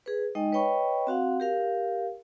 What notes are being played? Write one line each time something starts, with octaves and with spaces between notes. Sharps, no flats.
G#4 B4
G#3 D#4 D#5 G5
B4 C#5 D#5 G5 B5 C#6
C4 F#4 F5 F#5
G4 A#4 F5